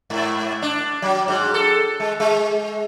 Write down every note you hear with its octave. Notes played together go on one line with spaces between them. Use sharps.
G#2
D4
F#3
G#2
A4
G#3
G#3